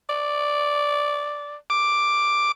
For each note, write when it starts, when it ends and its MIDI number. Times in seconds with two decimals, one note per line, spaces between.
0.09 1.56 74
1.70 2.52 86